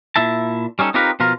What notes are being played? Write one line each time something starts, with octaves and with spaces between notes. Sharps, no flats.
A#2 E4 E5 A5
G3 C#4 D#4 A4
C4 D#4 F4 G4 A#4 B4
B2 F3 F4 A#4